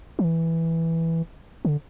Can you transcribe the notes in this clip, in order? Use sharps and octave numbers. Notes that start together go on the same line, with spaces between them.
F3
E3
D3